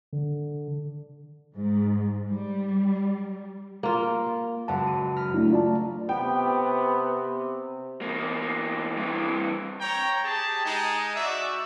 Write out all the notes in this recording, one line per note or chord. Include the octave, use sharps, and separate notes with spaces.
D3
G#2
G3
A#3 F4
C#2 F#2 F#5 A5
D#7
A#5 B5 F6
A3 D4 E4
F4 D5 A5
C3 B3 G5
E2 A#3
G2 E3
C#5 G5 A#5
G4 G#4 A5
G#3 D#4
F#4 D5 E5